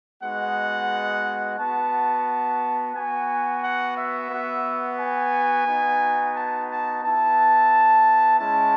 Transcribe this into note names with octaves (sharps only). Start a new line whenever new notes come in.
G#3 B3 D#4 F#4 F#5
B3 F#4 A5
B3 F#4 G#5
F#5
E5
B3 F#4
G#5
B3 D#4 F#4
A5
A5
B3 E4 A5
G#3 C#4 E4 A5